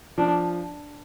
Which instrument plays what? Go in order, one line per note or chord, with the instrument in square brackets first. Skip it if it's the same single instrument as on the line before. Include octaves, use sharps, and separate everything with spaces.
[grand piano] F3 [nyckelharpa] D4